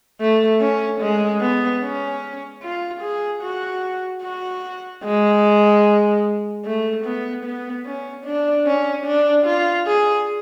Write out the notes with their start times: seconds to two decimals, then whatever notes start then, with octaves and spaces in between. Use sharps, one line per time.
0.21 A3
0.61 C#4
1.01 G#3
1.41 B3
1.82 C#4
2.63 F4
3.02 G#4
3.42 F#4
4.23 F#4
5.04 G#3
6.65 A3
7.05 B3
7.45 B3
7.85 C#4
8.25 D4
8.66 C#4
9.06 D4
9.46 F4
9.87 G#4